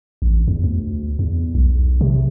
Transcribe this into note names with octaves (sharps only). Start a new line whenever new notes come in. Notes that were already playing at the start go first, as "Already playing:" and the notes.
A1
E2
D2
E2
B1
C3